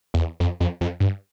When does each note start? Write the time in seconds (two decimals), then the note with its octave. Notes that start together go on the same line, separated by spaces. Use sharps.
0.14 E2
0.40 F2
0.60 F2
0.81 F2
1.00 G2